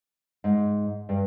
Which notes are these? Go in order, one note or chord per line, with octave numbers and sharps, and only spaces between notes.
G#2
G2